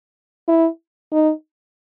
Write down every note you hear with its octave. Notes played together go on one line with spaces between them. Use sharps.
E4
D#4